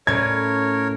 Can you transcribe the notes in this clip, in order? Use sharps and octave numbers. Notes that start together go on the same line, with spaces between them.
A2 C#4 A#4 C#5 D5 G#6